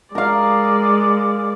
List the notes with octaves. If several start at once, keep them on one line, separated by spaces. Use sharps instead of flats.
G#3 A#4 D5 F5